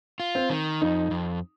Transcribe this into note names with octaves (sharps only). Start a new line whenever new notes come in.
F4
C4
D#3
F2 D#4
F2